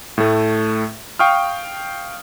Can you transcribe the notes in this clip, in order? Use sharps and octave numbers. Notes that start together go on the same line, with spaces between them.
A2 A3
F5 G5 C#6 D#6 F6